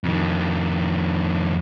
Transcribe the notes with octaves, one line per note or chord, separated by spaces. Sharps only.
F2 D#3